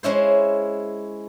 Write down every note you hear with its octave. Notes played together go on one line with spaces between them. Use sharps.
G#3 C#4 E4 C5